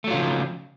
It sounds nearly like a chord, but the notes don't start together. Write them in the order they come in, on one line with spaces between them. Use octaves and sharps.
A3 F#3 F4 C#3 F3